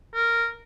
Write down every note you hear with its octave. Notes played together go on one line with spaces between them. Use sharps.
A#4